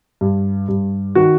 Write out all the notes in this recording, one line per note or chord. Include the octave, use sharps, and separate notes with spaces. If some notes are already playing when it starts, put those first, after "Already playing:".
G2
G2
D#3 F#4